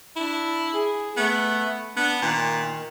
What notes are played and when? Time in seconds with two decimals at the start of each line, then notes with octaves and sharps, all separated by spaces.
0.16 D4 E4
0.74 G#4
1.17 A3 B3
1.97 B3 D4
2.22 A#2 D#3